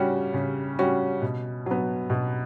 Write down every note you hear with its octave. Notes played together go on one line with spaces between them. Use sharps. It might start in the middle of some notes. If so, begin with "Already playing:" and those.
Already playing: C#3 G3 C#4 F#4
C#3
G3 C#4 F#4
B2
F#3 B3
B2